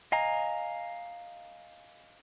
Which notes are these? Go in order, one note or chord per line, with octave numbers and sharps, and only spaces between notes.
D#5 F5 G#5 A#5